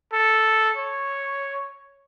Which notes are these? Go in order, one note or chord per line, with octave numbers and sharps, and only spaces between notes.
A4
C#5